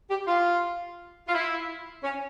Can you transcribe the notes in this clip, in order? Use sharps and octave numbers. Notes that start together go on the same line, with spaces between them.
G4
F4
F4
E4
C#4